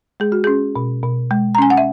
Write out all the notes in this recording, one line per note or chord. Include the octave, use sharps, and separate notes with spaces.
G#3 G#4
F#4
C#4 G#4
B2
B2
G#3
A#5
C#4 G#5
F#5
E5